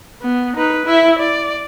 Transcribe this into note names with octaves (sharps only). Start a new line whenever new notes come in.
B3
D#4 B4
E4 E5
D5